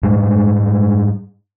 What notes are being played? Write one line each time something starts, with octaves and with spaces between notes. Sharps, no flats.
G#2 G3 G#3